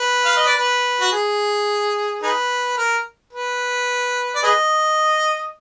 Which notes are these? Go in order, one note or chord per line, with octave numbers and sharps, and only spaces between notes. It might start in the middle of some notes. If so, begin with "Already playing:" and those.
Already playing: B4
F5
D#5
D5
B4
F#4
G#4
D#4 G#4 B4
A#4
B4
D5
G#4 B4 D#5